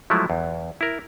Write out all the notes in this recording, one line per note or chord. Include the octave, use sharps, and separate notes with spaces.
F3 F#3 G#3 A3 E4
E2
E4 A#4